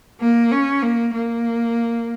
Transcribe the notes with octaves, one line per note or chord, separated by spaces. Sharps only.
A#3
C#4
A#3
A#3